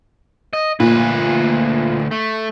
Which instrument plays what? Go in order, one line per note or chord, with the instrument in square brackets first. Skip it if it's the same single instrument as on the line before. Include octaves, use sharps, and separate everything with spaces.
[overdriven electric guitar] D#5
[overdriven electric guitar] D2 B4 [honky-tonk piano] A#2
[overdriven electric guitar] A3